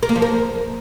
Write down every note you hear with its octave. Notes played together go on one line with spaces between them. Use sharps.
A#4
A#3
F3
A#4